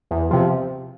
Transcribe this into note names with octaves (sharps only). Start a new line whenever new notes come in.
E2
C3 F3